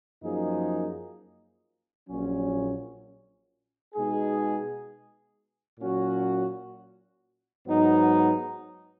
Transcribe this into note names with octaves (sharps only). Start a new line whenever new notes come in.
F#2 F3 A#3 D#4 G#4
A#1 A#2 F#3 C#4
B2 G#3 D#4 G#4
A#2 F#3 C#4 F#4
G#2 F#3 B3 D#4